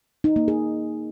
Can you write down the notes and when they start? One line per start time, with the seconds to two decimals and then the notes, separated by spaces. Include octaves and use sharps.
0.24 D#4
0.36 A#3
0.48 G#4